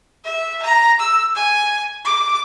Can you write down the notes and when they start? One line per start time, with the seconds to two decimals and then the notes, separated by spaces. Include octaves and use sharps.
0.25 E5
0.62 A#5
1.00 E6
1.35 G#5
2.05 D6